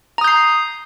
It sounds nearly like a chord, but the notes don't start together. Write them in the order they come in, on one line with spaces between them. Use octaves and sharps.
A#5 D#6 G6 C7